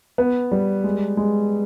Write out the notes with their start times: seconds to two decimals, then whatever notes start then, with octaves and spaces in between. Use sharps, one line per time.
0.18 B3
0.52 G3
0.84 G#3
1.17 G#3